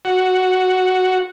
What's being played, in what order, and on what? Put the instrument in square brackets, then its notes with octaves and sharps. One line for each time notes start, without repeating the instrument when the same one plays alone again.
[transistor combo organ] F#4